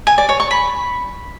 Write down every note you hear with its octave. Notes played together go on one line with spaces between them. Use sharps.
G#5
D5
C#5
C#6
B5